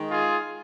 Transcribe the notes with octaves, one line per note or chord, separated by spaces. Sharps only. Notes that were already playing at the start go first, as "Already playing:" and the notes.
Already playing: D#3 G#3 D#4
F4 G#4